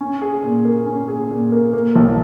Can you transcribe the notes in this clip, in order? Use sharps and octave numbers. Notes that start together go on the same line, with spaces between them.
C#4
G#4
A#2
A#3
C#4
G#4
A#2
A#3
A#3
B1